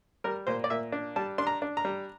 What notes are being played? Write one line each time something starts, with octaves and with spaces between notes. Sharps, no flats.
G3 A#4
A#2 C5
D5
A#2 E5
D4
G3 A5
D4 C6
A#5
D4
A#5
G3